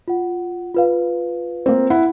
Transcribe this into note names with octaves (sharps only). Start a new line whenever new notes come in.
F4 F#5
F4 B4 F5
A#3 C4
E4 F#5